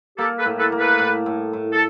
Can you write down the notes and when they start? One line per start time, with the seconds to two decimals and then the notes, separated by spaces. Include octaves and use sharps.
0.18 A#3 G4 A4
0.38 A4 B4
0.45 A2
0.58 A4 B4
0.72 A#3
0.79 A4 B4
0.99 A2
1.26 A2
1.53 A2
1.72 A4